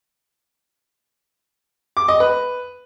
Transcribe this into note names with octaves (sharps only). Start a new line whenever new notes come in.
D6
D#5
B4